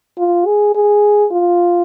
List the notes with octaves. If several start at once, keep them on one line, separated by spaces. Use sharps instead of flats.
F4
G#4
G#4
F4